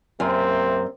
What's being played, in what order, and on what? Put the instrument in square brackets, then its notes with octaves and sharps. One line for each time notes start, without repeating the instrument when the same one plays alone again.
[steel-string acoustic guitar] F#2 [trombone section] C3 A#3 C4